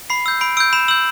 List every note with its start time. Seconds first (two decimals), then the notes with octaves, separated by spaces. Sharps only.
0.10 B5 C7
0.26 E6 G6
0.41 B5 D7
0.57 E6 G6 D7
0.73 B5 E7
0.88 E6 F#7
0.91 G6